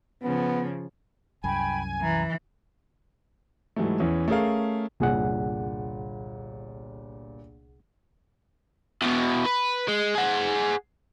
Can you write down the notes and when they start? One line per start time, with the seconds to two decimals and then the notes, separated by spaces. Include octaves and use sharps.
0.23 C#3 F3 B3
1.44 C2 F#2 G5 G#5 B5
2.01 E3 A#5
3.76 G#2 E3 F#3 G3 A3
4.00 E2 E3 C#4
4.28 A3 C#4 G#4 A#4 F5
5.00 G1 C2 A#2 G#4 F#5
9.02 E2 B2
9.45 B4
9.88 G#3
10.15 G#4 F#5